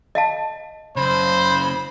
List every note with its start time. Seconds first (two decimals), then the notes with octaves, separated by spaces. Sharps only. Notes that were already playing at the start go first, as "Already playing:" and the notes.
0.15 D#5 F5 A5
0.96 F#2 C#3 C5 B5